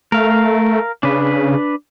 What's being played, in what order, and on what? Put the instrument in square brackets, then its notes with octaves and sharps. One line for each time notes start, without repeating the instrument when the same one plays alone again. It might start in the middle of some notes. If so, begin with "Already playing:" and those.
[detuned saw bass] A3 [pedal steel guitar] A#4 F5
[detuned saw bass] C#3 [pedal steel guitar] D4 B4